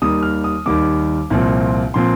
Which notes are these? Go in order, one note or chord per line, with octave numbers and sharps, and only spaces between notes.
D#2 D#3 G3 A#3 D#6
F6
D#6
D#2 D#3 G3 A#3 D6
C2 A#2 F3 C4
A#2 F3 C4 C6